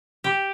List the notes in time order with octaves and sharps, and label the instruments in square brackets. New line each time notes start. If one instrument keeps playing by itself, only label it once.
[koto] G4